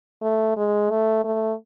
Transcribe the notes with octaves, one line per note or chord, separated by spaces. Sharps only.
A3
G#3
A3
A3